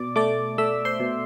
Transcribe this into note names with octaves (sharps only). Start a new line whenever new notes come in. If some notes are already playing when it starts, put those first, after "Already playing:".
Already playing: B2 D5 D6
A3 D5 D6
A3 E5 E6
C5 C6
B2